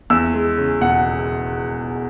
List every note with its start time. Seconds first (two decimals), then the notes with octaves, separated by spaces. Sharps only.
0.10 E2 E6
0.34 G#3
0.57 C#3
0.81 E1 F#5